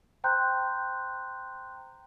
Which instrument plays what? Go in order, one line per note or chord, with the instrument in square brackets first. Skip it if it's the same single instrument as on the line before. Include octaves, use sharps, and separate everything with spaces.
[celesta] C5 G5 A#5 C6 F#6 G6